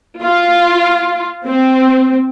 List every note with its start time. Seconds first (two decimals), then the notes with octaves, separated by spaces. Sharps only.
0.21 F4
1.45 C4